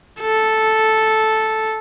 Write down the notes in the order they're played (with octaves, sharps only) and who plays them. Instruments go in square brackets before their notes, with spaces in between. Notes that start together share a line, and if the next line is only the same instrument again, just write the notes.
[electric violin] A4